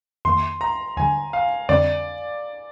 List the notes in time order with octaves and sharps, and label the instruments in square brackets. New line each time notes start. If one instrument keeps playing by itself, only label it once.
[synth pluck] F2 D#3 A#3 [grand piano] C6
[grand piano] A#5
[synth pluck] D#2 D3 G3 [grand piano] G#5
[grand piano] F5
[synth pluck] F2 D3 G3 C4 [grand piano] D5